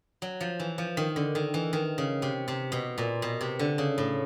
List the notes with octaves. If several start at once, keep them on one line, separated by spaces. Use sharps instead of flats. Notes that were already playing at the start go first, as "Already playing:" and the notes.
F#3
F3
E3
F3
D#3
D3
D#3
E3
D#3
C#3
C3
C3
B2
A#2
B2
C3
D3
C#3
A2